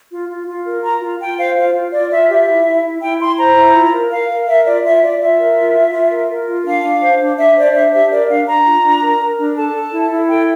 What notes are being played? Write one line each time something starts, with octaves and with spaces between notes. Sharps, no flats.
F4
F4
F4
A#4
F4 A#5
F4
F4 G5
C5 F5
F4 F5
F4
F4 D5
F4 E5
G4 E5
E4
E4
E4
E4 G5
E4 C6
C5 A#5
E4
F4
A#4
A#4 F5
A#4
A#4 E5
F4 D5
F4 E5
F4 D5
F4 E5
A#4
F4
F4
F4
A#4
A#4
F4
D4 F5
D4
C5
D4
D4 E5
C5 D5
D4 E5
G4 E5
A#4 D5
D4 F5
D4 A#5
F4
D4
A#4
A#4
D4
A4 A5
A4
E4
E4
A4 G5